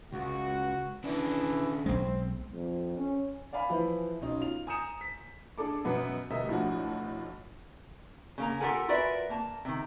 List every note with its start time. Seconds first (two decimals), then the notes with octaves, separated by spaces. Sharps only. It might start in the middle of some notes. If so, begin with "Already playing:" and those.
0.13 C#2 F#4
1.04 C#3 E3 D4
1.86 B1 G#3 C4
2.54 F2
2.97 C#4
3.53 D5 F5 G#5 B5
3.69 E3 F3 E4
4.21 B1 C#4 D#4
4.41 F4 F7
4.67 G#5 A#5 D#6 G6 C#7 E7
5.01 B6
5.58 D4 G#4 A4 D6
5.85 F#2 B2 B3
6.31 D2 B2 G3 A#4 D#5 E5
6.49 B1 A2 F3 D4 F#4
8.38 C#3 A#3 A#5
8.60 F4 G4 A4 A#4 F#5 G#5
8.88 F4 F#4 A#4 B4 D5 E5
9.30 A#3 A5
9.65 C3 D#3